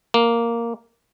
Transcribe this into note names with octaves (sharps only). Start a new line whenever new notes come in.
A#3